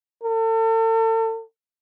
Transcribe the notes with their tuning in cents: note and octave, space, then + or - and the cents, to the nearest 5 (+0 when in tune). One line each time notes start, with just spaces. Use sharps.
A4 +40